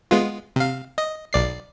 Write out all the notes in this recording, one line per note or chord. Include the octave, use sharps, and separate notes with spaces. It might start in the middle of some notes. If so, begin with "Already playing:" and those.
G#3 B3 F4
C3 F5
D#5
B1 D5 C7